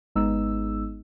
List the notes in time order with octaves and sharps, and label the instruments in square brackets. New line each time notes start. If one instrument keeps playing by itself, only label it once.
[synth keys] G#1 G#3 B3 D#4 E6